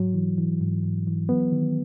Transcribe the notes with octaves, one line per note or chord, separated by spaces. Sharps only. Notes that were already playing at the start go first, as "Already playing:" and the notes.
Already playing: G#2 F#3
E3
E3
G#2
G#2
E3
F#3 B3
D#3